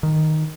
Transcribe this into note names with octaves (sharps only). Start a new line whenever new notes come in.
D#3